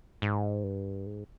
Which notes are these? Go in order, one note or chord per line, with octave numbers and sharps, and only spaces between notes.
G#2
G2
G#2